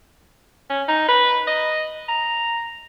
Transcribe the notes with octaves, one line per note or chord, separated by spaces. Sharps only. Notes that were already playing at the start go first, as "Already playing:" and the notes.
C#4
D#4
B4
D#5
A#5